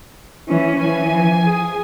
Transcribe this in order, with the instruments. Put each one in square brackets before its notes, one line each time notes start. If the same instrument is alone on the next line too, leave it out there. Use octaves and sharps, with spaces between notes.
[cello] E3 C#4
[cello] E3 [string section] F3 G#5
[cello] G#4